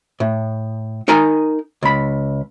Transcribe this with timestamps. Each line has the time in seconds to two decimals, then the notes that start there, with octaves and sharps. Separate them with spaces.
0.20 A2
1.08 D#4 A#4 G#5 A#5
1.83 C#2 B5